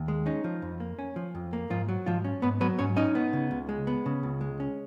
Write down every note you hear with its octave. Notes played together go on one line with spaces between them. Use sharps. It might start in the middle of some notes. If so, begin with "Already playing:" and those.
Already playing: D#2
G#3
C#4 D#4
F3
F2
A#3
C#4
F3
F2
A#3
G#2 F3 F4
F#3
G#2 F3 F4
C#4
G#2 B3 B4
F#3 B3 B4
G#2 C#4 C#5
C#4 D#4 D#5
B3
C#3
C#2
G#3
B3
C#3
C#2
G#3
C#4